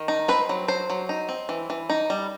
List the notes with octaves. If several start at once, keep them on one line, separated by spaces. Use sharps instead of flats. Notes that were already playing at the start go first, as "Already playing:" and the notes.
Already playing: D#3
D#4
C4 B4
F#3
F#3 C5
F#3
D#4
C4
E3
E3
D#4
G3